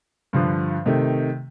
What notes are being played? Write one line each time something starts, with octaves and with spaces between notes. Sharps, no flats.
G2 D3 F3
C3 D#3 A3